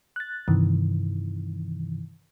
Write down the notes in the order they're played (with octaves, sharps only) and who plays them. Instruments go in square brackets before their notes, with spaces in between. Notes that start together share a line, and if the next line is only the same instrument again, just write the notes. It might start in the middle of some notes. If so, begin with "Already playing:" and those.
[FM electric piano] F#6 A6
G2 C3 D#3 E3